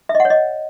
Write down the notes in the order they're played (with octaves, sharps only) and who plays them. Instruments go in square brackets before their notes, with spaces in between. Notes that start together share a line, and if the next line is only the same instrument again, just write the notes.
[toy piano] E5
D#5
F#5
C#5
D#5